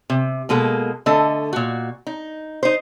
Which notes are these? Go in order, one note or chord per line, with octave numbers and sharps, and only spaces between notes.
C3
B2 G#3 A#3 A4
D3 A3 A4 D#5
A#2 F#4
D#4
D#4 C5